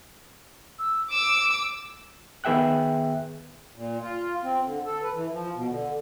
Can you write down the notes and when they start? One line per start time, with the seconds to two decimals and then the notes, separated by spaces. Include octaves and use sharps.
0.79 E6
1.11 D6 E6 E7
2.44 D#3 B3 G#4 E5 G5 F#6
3.74 A#2
4.01 F4
4.43 C4
4.65 D3
4.85 A4
5.02 B4
5.14 E3
5.32 F3
5.55 B2
5.69 D3